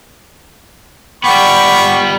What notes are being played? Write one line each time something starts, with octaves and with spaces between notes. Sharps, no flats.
G3 B3 F#5 G5 B5 C#6 D6